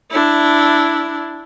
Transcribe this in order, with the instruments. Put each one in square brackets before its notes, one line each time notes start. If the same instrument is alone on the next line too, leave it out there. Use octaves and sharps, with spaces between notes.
[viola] D4 E4